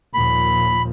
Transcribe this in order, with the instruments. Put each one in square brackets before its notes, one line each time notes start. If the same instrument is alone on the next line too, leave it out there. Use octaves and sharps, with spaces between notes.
[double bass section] D#2 A#2 F3 [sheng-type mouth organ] B5